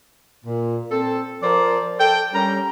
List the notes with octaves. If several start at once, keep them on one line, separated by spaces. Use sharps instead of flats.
A#2
C4 A4
F3 A#4 C5 D5
A4 G5
G3 C#4 A#5